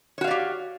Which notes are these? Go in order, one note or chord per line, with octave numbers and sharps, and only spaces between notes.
F#4 G4 C#5 D5 F5